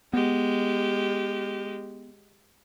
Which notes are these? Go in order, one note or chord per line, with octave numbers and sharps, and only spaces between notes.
G#3 B3 G4